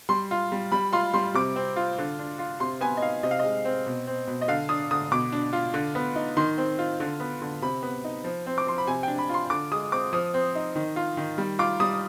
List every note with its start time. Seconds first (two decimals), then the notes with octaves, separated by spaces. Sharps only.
0.09 G3 C6
0.31 F4
0.52 G3
0.72 G3 B5
0.93 F4 C6
1.14 G3 C6
1.34 C3 D6
1.56 C4
1.76 F4
1.98 D3
2.19 D4
2.39 F4
2.60 C3 C6
2.81 B3 G#5
2.97 D#5
3.02 D#4 F5
3.23 C3 D#5
3.31 F5
3.39 G#3 D#5
3.65 C4
3.86 B2
4.07 C4
4.27 B2
4.41 D#5
4.48 D3 F5
4.69 D4 D#6
4.91 D3 D#6
5.11 B2 D6
5.32 D4
5.53 F4
5.74 D3
5.95 B3
6.16 D#4
6.37 D#3 C6
6.58 C4
6.79 F4
7.00 D3
7.20 B3
7.42 D3
7.62 C3 B5
7.83 B3
8.04 D#4
8.24 F3
8.46 C4
8.58 D6
8.67 F3 C6
8.78 B5
8.87 C3 G#5
9.03 D4 G5
9.18 B5
9.29 F4 C6
9.50 D3 D6
9.72 G#3 D#6
9.92 C4 D6
10.13 F3 D#6
10.34 C4
10.55 D#4
10.75 D#3
10.96 F4
11.17 D#3
11.38 G3
11.59 F4 D6
11.80 G3 D#6